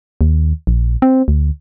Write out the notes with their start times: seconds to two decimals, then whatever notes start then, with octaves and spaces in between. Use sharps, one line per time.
0.21 D#2
0.67 A#1
1.02 C4
1.28 D2